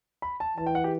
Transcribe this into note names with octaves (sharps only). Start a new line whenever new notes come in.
B5
A5
E3 A5
G5
F#5
G4